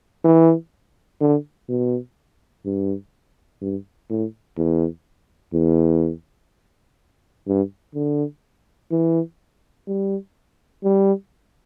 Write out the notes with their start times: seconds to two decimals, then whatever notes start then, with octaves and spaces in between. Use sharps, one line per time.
0.24 E3
1.21 D3
1.69 B2
2.65 G2
3.61 G2
4.10 A2
4.57 E2
5.54 E2
7.47 G2
7.95 D3
8.91 E3
9.87 G3
10.84 G3